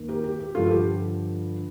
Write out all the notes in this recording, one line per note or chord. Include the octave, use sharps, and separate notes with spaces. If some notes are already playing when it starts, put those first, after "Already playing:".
Already playing: D#2 D#3
G4 A#4
G4
G4
G2 D3 F3 F4 A4
A4
G4